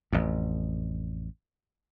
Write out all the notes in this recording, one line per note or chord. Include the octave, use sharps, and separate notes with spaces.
A1 F2